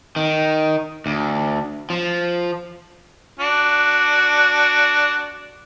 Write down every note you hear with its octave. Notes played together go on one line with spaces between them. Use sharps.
D#3
D2
F3
D4 F#4